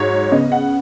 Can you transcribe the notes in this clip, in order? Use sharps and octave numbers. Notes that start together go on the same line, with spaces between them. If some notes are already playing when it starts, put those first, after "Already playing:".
Already playing: G#2 F#3 C#5
C#3 B3 D#5
F#5